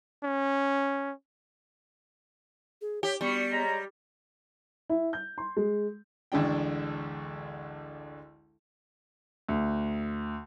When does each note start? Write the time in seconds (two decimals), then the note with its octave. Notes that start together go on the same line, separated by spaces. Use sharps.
0.24 C#4
2.81 G#4
3.03 G4 C#5
3.21 G3 B3 D4 F#4 C#6
3.51 G#3 C#5 A#5
4.90 E4
5.13 G6
5.38 C6
5.57 G#3
6.32 A1 D2 D3 G#3 D4 G5
9.49 D2